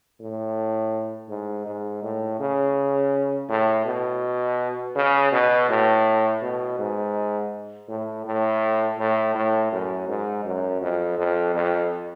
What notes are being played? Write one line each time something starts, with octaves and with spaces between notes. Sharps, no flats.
A2
G#2
G#2
A2
C#3
A2
B2
C#3
B2
A2
B2
G#2
A2
A2
A2
A2
F#2
G#2
F#2
F2
F2
F2